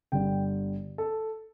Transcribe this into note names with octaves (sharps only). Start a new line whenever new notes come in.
G1 G2 D3 G3 G5
A4